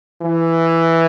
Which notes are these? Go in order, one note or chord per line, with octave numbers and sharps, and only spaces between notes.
E3